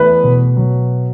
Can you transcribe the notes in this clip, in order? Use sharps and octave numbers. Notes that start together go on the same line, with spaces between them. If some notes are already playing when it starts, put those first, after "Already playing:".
Already playing: E2 A3 B4
B2
F#3